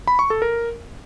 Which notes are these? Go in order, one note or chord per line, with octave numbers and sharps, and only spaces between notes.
B5
C#6
A4
A#4